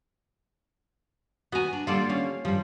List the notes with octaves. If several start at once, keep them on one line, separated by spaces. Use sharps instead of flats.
B3 F#4 G#5 A#5
D4
D3 G3 A#3 F4 A4 D5
C#4 F5
G2 F3 G3